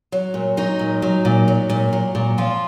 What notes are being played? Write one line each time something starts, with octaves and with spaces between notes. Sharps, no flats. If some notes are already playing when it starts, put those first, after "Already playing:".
F#3
A#2
F#3 D#4
A#2
F#3
A#2
F#3
A#2
F#3
A#2
F3 F4